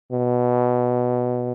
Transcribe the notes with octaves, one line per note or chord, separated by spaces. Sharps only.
B2